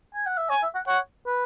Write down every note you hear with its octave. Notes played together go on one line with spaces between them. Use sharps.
G#5
F#5
E5
C#5 G#5
E5
F#5
C#5 F#5
B4